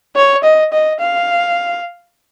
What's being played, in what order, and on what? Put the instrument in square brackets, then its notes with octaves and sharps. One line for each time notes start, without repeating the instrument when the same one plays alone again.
[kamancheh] C#5
D#5
D#5
F5